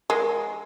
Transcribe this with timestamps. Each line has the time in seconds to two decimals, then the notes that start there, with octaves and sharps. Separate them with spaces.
0.10 G#3 A#4